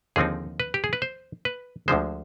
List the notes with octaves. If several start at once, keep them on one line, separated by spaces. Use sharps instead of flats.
D#2 D3 F3 C4 D#4 G#4
B4
G4
G#4
B4
C5
B4
D2 D3 F3 G#3 C5